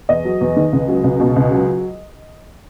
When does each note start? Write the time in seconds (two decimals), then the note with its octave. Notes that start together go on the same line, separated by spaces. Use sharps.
0.09 E2 D#5
0.25 F#3
0.41 E2
0.57 D#3
0.72 C#2
0.88 F#3
1.04 C#2
1.20 B2
1.36 C#2
1.52 F#3